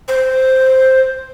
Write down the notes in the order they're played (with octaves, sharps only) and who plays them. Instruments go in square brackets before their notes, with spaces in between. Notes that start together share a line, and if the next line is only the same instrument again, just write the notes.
[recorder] C5